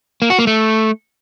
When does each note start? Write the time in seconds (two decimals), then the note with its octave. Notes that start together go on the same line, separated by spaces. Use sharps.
0.22 A#3
0.30 F#4
0.39 A#3
0.47 A3